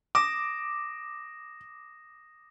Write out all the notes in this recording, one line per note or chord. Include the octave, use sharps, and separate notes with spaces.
D6 D#6 A#6 E7